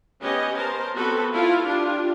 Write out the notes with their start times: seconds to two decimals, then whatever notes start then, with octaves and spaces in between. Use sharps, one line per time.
0.20 B3 C#4 G4 C#5 D#5
0.56 A#4 C5 A5
0.95 B3 C4 F#4 A4 B4
1.33 E4 F4 A4 F5
1.65 D4 F4 G4